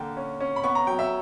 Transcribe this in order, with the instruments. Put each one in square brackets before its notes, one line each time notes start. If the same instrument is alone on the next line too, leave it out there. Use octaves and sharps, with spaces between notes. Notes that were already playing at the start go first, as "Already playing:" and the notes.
Already playing: [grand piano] D3 A#3 G5
C#4
C#4
B5
B3 C#6
A#5
F#3 G5
E5